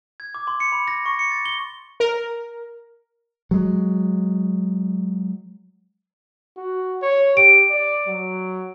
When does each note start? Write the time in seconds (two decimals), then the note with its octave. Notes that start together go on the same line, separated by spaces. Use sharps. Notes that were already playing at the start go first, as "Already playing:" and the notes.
0.20 G#6
0.35 D6
0.47 C6
0.60 C#7
0.72 B5
0.88 A#6
1.06 C#6
1.19 C#7
1.31 A6
1.45 G7
2.00 A#4
3.51 F#3 G#3
6.57 F#4
7.02 C#5
7.37 G4 D7
7.70 D5
8.07 F#3